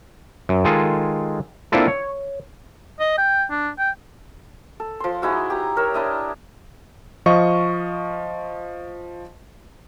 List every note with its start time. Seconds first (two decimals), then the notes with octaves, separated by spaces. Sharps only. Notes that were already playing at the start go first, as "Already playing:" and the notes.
0.49 F#2
0.64 D#3 G#3 F4 G#4 A4
1.72 A#3 C4 D4 E4 F4 A4
1.88 C#5
3.00 D#5
3.18 G5
3.50 D4
3.79 G5
4.80 A4
5.00 F3 C6
5.22 G#3 D#4 E4 F#4
5.50 G4 A#5
5.76 A#4 C#5 E5
5.94 D4 E4 D#5
7.26 F3 D#5 F5 C#6